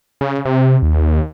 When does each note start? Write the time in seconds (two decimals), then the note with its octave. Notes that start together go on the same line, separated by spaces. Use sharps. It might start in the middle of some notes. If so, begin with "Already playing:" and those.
0.21 C#3
0.45 C3
0.82 D#2